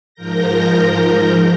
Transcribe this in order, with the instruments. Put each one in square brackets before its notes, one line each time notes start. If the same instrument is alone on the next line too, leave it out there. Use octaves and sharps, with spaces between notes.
[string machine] G#2 F3 A#4 G6 A#6